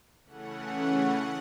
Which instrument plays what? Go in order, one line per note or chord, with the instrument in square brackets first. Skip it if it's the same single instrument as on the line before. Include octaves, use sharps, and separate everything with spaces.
[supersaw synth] C#3 E3 A3 C#4 F#5